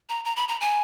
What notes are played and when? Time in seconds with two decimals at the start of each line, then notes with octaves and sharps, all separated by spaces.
0.09 A#5
0.25 A#5
0.36 B5
0.48 A#5
0.61 G#5